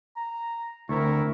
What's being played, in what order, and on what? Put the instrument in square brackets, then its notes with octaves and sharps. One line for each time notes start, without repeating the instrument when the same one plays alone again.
[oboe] A#5
[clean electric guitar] D2 [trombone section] C4 E4 A#4 [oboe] C#6